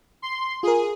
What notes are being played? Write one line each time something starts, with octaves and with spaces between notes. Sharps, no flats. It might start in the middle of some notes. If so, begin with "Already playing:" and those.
C6
F4 G#4 A#4